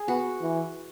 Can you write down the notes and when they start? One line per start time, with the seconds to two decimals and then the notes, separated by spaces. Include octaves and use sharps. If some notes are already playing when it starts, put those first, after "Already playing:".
Already playing: G#4
0.08 B3 F#4
0.41 E3